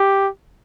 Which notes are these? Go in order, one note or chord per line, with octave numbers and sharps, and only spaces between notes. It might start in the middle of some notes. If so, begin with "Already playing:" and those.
Already playing: G4